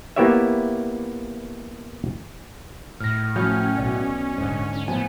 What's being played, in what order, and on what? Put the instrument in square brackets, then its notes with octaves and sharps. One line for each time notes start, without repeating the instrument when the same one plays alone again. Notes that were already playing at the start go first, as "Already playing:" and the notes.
[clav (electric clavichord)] A#3 B3 E4 G4 C#5 E5
[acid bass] A2 [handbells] F6 A#6
[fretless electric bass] F3 F#3 [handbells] A3 F6 G6 [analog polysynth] C#4
[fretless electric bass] B1 B2 [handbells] D5
[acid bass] D#1 [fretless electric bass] G#2 D3
[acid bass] C#4
[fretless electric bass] A2 F3 [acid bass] B3 [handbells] G#5